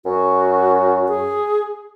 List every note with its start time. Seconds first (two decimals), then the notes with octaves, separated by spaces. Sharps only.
0.05 F#2 F#4
1.08 G#4